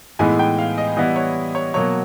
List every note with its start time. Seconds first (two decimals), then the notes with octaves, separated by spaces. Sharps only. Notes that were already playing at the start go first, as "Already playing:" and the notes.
0.19 A2 E3 G#3 B3 D#4 G#5
0.39 G5
0.59 F5
0.78 D#5
0.97 E3 G3 B3 E4 D#5
1.16 C#5
1.55 C#5
1.74 B2 F#3 A#3 C#5